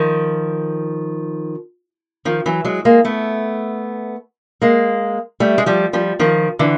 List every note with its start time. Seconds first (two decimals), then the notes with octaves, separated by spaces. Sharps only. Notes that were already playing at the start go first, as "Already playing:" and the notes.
Already playing: D#3 F3
2.25 D#3 F3
2.46 E3 F#3
2.65 F#3 G#3
2.85 G#3 A#3
3.05 A3 B3
4.62 G#3 A#3
5.40 G3 A3
5.58 G#3
5.66 F3 G3
5.93 F3 G3
6.19 D#3 F3
6.59 D3 E3